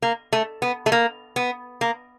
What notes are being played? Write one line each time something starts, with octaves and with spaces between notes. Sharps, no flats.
A#3
A3
B3
A3
A#3
B3
A#3